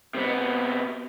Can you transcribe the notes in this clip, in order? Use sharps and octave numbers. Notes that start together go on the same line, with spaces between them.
C3 B3